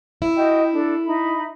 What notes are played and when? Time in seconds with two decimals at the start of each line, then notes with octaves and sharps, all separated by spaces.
0.22 E4
0.37 F#4 D#5 G5
0.73 D4 A4
1.06 D#4 E5 B5